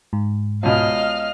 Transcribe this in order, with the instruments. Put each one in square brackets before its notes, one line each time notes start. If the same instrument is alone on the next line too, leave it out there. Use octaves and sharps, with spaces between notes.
[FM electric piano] G#2
[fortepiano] C#2 B2 [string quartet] D#5 F5 F6